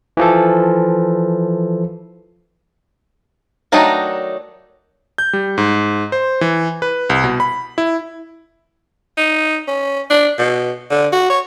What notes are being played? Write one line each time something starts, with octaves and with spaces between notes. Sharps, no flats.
E3 F3 A4
D#3 F#3 A3 D4 D#4
G6
G3
G#2
C5
E3
B4
C2
B2
B5
E4
D#4
C#4
D4
B2
D3
F#4
C#5